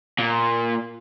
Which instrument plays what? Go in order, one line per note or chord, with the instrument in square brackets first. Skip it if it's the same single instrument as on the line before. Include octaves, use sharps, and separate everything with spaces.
[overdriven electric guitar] A#2